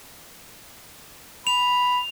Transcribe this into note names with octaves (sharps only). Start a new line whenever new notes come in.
B5 F7